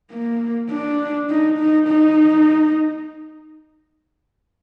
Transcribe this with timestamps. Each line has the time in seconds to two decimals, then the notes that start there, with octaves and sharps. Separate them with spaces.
0.11 A#3
0.70 D4
1.30 D#4
1.58 D#4
1.88 D#4